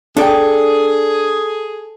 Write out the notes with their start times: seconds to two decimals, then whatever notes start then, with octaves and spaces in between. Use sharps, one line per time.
0.17 D4 G#4 A4 D5 G5